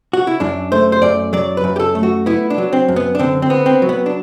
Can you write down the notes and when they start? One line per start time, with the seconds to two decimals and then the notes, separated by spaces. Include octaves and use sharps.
0.13 F#4
0.27 E4
0.40 F#2 D4
0.72 A3 C5
0.92 C5
1.02 F#2 D5
1.33 F#3 D5
1.57 B4
1.64 F#2
1.76 G4
1.80 A4
1.95 A3
2.03 F#4
2.26 B3 E4
2.50 D4
2.58 F#3
2.73 C4
2.88 F#2
2.96 B3
3.15 D4
3.19 D3 C4
3.42 C4
3.50 B3
3.66 C4
3.82 F#3
3.89 B3
4.06 D4